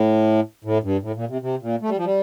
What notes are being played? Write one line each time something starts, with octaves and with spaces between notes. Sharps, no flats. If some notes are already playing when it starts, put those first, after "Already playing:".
Already playing: A2
A2
G2
A2
A#2
C3
C3
A#2
A3
G3
F3
G3